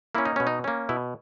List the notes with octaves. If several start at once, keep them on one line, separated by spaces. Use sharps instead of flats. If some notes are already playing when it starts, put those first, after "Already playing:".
A#3 C#4 E4
D#4
B2 C#4
D#4
A#3 C#4
B2 E4